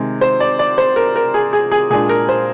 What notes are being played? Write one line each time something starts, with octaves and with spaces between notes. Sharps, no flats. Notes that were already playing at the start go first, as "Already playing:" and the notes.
Already playing: C3 D#3 G#3
C5
D5
D5
C5
A#4
A#4
G#4
G#4
G#4
A#2 G#3 D4 G#4
A#4
C5